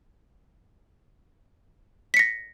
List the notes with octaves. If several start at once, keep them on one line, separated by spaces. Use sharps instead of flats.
A#6 B6 C#7